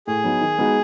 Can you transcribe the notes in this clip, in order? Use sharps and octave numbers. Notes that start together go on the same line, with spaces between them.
A2 G#4
F#3 B3 D#4
D#3
G#3 B3 D#4 F#4